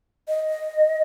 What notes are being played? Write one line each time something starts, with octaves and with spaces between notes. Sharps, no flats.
D#5